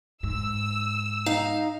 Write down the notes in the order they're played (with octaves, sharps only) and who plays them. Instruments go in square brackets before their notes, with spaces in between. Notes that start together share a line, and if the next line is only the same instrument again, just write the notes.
[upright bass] G#2 [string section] E6
[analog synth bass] D#4 [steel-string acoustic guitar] F5